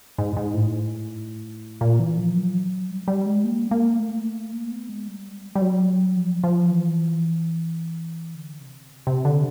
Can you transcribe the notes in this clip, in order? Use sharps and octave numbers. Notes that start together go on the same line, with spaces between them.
G#2
G#2
A2
A#2
E3
F3
F#3
G3
G3
G#3
A#3
A#3
A3
A#3
B3
G#3
G3
G3
F#3
F3
F3
E3
D3
C3
C3
D3